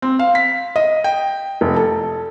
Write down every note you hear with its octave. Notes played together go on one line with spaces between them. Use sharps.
C4
F5
B6
D#5
G5
F1
A4